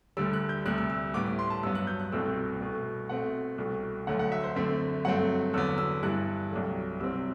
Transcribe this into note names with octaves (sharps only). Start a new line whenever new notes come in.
D2 D3 G3 E6
F#6
G6
D2 C3 G3 F#6
E6
E6
A2 G3 B3 D6
D6
C6
A5
G2 F#3 B3 E6
F#6
G6
F#6
C2 B2 A3 C4 E6
C2 B2 A3
B2 A3 C4 F#5
C2 B2 A3
D2 D3 F#3 A3 F#5
F#5
E5
C5
F#2 D3 A3 C4 E5
G2 F#3 A3 C4 F#5
E2 D3 F#3 B3 E6
E6
G2 E3 G3 F#6
C2 C3 F#3 A3
C2 C3 F#3 C4 E6